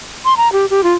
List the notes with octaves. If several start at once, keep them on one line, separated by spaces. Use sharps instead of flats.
C6
A#5
G4
G4
F4